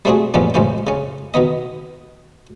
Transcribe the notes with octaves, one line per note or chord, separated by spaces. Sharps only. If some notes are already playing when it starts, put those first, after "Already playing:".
G3 A3 C4 D4 F#4 G#4
A1 F2 A#2 F3 B3 C#4
A1 F2 G#2 C#3 C#4 G5
C#3 C#4
B2 D#3 B3 D#5